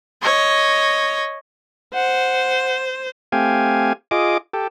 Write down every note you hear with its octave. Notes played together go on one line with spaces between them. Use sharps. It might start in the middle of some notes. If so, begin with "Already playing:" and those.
C#5 D#5
C5 F#5
A3 C4 G4 F5 G#5
F4 G#4 D#5 D6
G4 A4